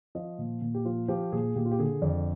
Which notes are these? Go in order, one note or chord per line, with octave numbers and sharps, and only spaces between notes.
F3 D#5
A#2
A#2
G4
F3 F4
F3 G4
A#2 G#4
A#2 G4
F4
G4
D3 G#4
F2 D5